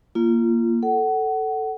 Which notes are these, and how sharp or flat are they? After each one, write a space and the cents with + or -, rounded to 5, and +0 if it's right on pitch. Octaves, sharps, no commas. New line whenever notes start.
A#3 +0 F4 -30
A4 +0 F#5 +25